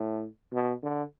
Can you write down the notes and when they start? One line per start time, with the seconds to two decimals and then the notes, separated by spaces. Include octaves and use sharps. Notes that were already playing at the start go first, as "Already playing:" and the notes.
Already playing: A2
0.52 B2
0.83 D3